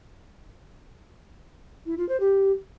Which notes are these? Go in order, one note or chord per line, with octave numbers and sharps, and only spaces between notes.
E4
F4
C5
G4